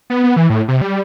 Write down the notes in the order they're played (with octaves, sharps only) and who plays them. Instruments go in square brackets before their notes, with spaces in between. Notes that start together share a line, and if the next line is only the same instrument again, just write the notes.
[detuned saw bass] B3
B3
E3
A2
C3
G3